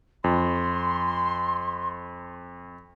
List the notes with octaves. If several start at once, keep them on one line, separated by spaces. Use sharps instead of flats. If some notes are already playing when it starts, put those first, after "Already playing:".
F2 C6